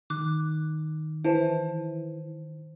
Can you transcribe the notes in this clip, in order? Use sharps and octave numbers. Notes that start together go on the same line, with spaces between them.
D#3 D6 F#6
E3 C5 A5